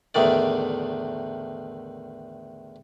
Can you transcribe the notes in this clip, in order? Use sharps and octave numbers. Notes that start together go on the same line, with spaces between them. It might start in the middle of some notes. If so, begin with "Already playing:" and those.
E2 A2 D3 D#3 D5